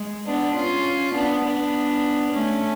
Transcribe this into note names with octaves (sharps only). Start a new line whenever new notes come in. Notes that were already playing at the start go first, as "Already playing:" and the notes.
Already playing: G#3
B3 D4
C#4 F4
B3 D4
B3 D4
A3 C#4